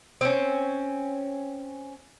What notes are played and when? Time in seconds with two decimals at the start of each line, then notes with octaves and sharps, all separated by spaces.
0.21 C4 C#4